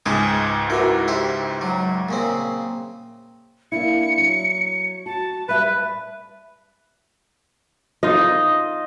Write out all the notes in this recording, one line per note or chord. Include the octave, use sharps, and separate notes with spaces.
C#2 G#2 G#4
D4 E4 F#4 A#4 B4
E4 G4 C5 E5
F#3
A#2 C#3 C4
A#3 D4 E4 C#7
F#3
F#4 A5
G3 B4 E5
D#4 F4 D#5